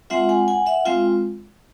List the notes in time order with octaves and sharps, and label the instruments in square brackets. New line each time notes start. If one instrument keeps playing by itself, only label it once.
[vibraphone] G#3 C4 F4 E5 F#5
F#5 G#5
F#5 G#5
E5 F#5
G#3 C4 F4 F5 G5